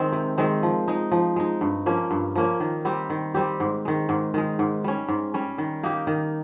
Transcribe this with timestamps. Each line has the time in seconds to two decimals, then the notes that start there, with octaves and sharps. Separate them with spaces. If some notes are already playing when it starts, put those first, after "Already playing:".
Already playing: D#3 G#3 C4
0.12 C3
0.38 D#3 G#3 C4
0.63 F3
0.88 G#3 D#4
1.11 F3
1.36 G#3 D#4
1.61 G2
1.86 F3 A#3 C#4
2.11 G2
2.35 F3 A#3 C#4
2.60 D#3
2.85 G3 C4 G4
3.10 D#3
3.35 G3 C4 G4
3.60 G#2
3.85 D#3 G#3
4.09 G#2
4.34 D#3 G#3
4.59 G#2
4.84 G3 C#4
5.08 G#2
5.34 G3 C#4
5.58 D#3
5.83 A#3 D#4 G4
6.07 D#3